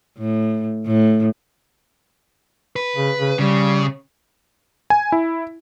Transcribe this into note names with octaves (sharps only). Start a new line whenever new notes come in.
A2
A2
B4
C#3
C#3
C#3 G3
G#5
E4